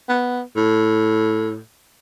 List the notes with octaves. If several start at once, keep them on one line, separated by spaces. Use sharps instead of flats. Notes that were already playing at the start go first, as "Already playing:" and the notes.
B3
A2